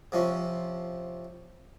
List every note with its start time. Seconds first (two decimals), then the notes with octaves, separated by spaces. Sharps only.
0.12 C3 F3 C#4